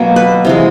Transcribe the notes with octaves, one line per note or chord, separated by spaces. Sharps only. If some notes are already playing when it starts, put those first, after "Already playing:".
Already playing: B2 F#3 A#3
B4
C3 E3 G#3